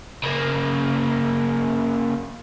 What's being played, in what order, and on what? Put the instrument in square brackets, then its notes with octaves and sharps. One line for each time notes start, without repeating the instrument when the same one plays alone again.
[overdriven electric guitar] C#3 A#3